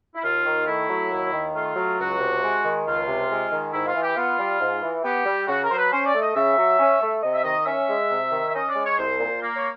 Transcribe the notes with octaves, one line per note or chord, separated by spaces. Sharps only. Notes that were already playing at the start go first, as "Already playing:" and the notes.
E4
D#2 F4
D#3
A3 E4
F#3
D#2
D#3
A3 F4
F#3
C#2 F#4
C3
G#3
D#3
C#2 F4
C3
G#3
D#3
G#2 E4
F4
E3
G4
B3 F4
G3
G#2
E3
B3 G4
G3
C#3 F#4
A#4
F#3 C5
B4
C#4 C5
D5
A3
D#5
C#3 E5
F#3
C#4
A3
C3 D#5
E5
D#3 D#5
C#4 E5
G#3
C3
D#3
E5
C#4 D#5
D5
G#3
C#5
C2 C5
A#2
A#3
C#5